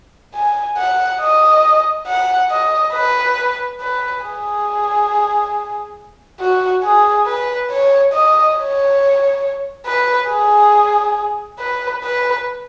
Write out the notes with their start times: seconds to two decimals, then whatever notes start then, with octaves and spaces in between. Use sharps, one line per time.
0.34 G#5
0.77 F#5
1.20 D#5
2.07 F#5
2.50 D#5
2.93 B4
3.80 B4
4.23 G#4
6.39 F#4
6.83 G#4
7.26 B4
7.70 C#5
8.13 D#5
8.57 C#5
9.86 B4
10.29 G#4
11.59 B4
12.03 B4